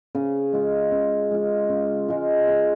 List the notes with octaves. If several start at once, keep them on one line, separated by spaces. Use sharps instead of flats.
C#3
G#3 F4
C#3
G#3 F4
C#3
G#3 F4
C#3